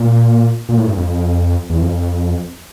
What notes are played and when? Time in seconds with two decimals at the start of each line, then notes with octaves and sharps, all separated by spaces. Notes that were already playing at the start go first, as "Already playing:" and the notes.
Already playing: A#2
0.69 A#2
0.77 A2
0.87 G2
0.97 F2
1.70 E2
1.81 F2